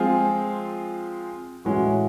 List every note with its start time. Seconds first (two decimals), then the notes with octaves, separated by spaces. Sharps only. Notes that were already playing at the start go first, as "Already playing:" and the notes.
Already playing: F3 G#3 C4 F4 G#4
1.65 A2 E3 G#3 C#4 F#4